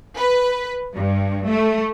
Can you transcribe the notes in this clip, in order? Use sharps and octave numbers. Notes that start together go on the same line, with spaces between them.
B4
G2
A3